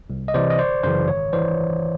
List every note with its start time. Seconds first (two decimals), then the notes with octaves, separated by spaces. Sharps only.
0.10 C2
0.28 D#5
0.34 C3 E3 C5 D5
0.50 D#5
0.59 G1 C5 D5
0.83 F#2 C#3 E3 C5
1.08 G#1 C#5
1.33 E3 C5 D5